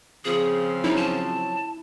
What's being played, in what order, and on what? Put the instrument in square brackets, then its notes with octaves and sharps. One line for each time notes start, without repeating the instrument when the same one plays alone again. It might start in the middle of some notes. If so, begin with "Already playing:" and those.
[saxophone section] C#3 F3 C4 [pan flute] G#4
[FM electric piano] F#3 C#4 C#5 [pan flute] D#4 [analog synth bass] E4
[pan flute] A5